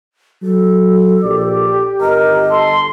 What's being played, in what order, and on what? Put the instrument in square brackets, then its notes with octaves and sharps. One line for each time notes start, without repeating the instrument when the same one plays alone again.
[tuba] F#3 [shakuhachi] A4
[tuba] A#1 [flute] G4 [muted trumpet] D5
[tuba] G1 [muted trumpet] A#4 [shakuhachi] D#5
[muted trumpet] A4 [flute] C6